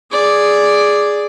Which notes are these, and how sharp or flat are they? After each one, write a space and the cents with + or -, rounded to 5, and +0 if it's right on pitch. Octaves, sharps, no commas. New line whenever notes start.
G#4 +0 D5 +0